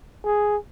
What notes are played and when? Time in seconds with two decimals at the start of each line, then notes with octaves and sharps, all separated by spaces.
0.25 G#4